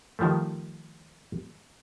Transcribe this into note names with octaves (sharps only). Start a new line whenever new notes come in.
D#3 F3 G3 A3